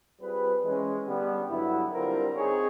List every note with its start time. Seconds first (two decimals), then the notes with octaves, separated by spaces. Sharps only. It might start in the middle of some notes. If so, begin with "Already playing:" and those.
0.21 G3 C4 F4 G#4 B4
0.64 E3 G#3 C#4
1.07 D3 G3 B3
1.50 G2 D3 F#3 B3 E4
1.92 D3 G3 C4 F4 A#4
2.35 C4 D#4 G#4 C#5